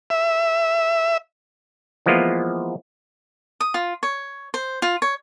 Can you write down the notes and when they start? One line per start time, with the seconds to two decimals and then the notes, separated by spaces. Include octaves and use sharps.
0.10 E5
2.06 E3 F3 G#3 A#3 B3 F4
3.61 D#6
3.74 F4
4.03 C#5
4.54 C5
4.82 F4
5.02 C#5